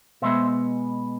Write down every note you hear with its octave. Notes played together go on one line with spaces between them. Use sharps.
B2 G#3 B3 C5 E5